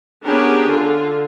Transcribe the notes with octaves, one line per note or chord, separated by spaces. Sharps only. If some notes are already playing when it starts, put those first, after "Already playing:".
B3 C#4 D4 G4 G#4 A#4
D3 F4